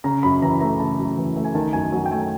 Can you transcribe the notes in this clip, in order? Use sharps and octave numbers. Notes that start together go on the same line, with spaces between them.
C#3 A#5
F#2 B5
E3 A#5
A3 A#5
C#3 A5
F#2
E3
A3
G#5
D#3 A5
F#2 G#5
F#3 G#5
G5
A3 G#5